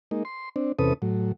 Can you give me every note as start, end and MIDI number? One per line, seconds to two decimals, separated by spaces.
0.11 0.23 56
0.11 0.23 58
0.11 0.23 63
0.25 0.49 84
0.56 0.72 60
0.56 0.72 62
0.79 0.93 40
0.79 0.93 48
0.79 0.93 61
0.79 0.93 69
0.79 0.93 71
0.79 0.93 87
1.02 1.32 45
1.02 1.32 54